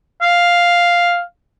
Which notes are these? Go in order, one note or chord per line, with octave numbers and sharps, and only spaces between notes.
F5